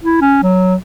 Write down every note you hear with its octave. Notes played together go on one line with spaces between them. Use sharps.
E4
C#4
F#3